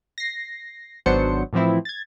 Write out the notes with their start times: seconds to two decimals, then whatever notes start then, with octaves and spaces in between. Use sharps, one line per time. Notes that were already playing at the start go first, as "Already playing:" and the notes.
0.18 A#6 C7
1.06 G#1 F#3 B3 D4 C5 C#7
1.53 A2 E3 F3 C4 E4
1.85 G#6 A6